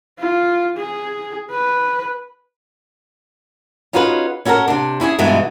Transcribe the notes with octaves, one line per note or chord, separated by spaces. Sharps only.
F4
G#4
B4
C#4 D#4 F4 F#4 G#4 B4
C#4 E4 F#4 A4 A#4
C3 D4
C#4 E4 G4 G#4
G2 B2 E3 G#3 B3 D#4